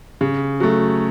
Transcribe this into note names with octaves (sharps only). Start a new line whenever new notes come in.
C#3
F#3 A3